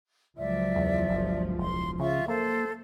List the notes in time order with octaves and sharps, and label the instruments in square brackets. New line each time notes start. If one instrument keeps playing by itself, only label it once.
[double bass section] C#2 F3 F#3 [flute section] D5 E5
[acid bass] E2
G1
[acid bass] E1 [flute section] C6
[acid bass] C#3 [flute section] F4 E5 C#6
[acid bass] A#3 [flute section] A4 C5